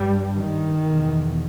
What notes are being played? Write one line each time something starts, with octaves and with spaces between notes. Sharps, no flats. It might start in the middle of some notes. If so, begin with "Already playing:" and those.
Already playing: G2 G3
D#3
E2 B2